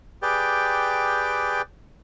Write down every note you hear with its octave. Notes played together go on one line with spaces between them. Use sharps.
G4 G#4 B4 D5 G5